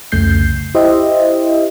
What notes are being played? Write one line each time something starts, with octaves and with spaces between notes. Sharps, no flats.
C2 F2 C#3 A3 G6 C7
E4 G4 C5 D#5 E5